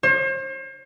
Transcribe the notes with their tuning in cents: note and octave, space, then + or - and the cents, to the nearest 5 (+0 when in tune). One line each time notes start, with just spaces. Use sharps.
C5 +40